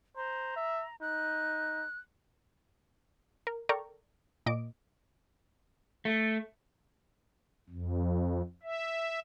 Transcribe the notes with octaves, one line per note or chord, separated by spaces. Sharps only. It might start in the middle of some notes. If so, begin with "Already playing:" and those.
C5 A#5
E5
D#4 F#6
A#4
A4 A#4 D5 G5 A#5 C#6
A#2 D#5 D6 D7
A3
F2
E5